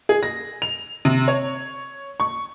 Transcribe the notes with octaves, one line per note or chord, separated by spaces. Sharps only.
G#4
A#6
F7
C3
C#5
C#6